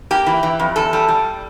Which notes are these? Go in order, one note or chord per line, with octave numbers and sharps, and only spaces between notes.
A#3 G4
E3
E3
F2
E2 A4
G3
G3